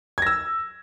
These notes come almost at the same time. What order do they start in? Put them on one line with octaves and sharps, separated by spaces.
G#6 A#6 E6